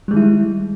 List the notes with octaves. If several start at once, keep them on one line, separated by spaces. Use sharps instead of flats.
D#3 G3 G#3 E4